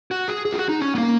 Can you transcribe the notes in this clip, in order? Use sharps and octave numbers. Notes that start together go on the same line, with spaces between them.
F#4
G#4
G#4
F4
F#4
D#4
C#4
B3
A#3